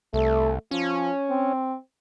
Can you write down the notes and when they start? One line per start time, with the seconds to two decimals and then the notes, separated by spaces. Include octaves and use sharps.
0.13 C2 A3
0.71 F3 C#4
1.30 C4